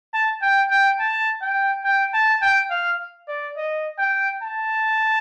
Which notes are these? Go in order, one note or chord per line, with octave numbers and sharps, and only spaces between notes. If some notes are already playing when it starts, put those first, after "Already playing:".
A5
G5
G5
A5
G5
G5
A5
G5
F5
D5
D#5
G5
A5